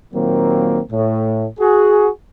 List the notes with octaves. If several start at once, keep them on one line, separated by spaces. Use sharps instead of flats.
A#2 D#3 F#3 A#3 C4
A2
F#4 G#4